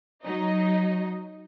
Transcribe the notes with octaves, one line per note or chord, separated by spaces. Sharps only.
F#3 D#4 D#5